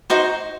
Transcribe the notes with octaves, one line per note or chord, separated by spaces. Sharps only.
D#4 F#4 C5